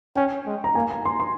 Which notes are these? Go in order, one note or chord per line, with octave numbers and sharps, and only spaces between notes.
C#4 G5
G#3
A#5
A#3 G#5
A#5
C6
C6